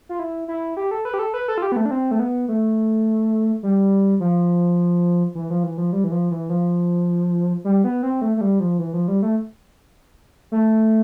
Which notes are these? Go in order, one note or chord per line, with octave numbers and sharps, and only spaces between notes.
F4
E4
E4
G4
A4
B4
G4
A4
B4
A4
F4
G4
B3
A3
D4
C4
A3
B3
A3
G3
F3
E3
F3
E3
F3
G3
E3
F3
E3
F3
G3
B3
C4
A3
A3
G3
F3
E3
F3
G3
A3
A3